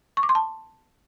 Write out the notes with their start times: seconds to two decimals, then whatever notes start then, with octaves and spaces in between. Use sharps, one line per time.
0.17 C#6
0.23 D6
0.29 C6
0.35 A5